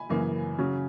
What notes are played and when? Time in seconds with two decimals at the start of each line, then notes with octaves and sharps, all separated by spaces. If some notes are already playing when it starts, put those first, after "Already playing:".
Already playing: G#5 B5
0.09 F#2 C#3 E3 A#3
0.59 C#3 F#3 C#4